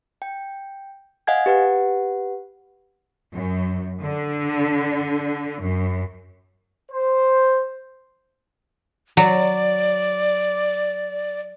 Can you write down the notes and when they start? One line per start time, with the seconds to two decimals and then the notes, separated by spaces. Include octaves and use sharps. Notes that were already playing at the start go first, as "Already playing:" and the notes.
0.22 G5
1.27 D#5 F5 F#5 G#5 G#6
1.46 G4 B4 F#5
3.33 F#2
4.02 D3
5.62 F#2
6.91 C5
9.17 F#3 D5